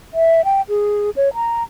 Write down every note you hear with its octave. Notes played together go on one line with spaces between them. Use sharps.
E5
G5
G#4
C#5
A#5